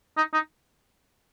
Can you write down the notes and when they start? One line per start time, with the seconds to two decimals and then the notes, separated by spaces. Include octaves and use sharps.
0.17 D#4
0.33 D#4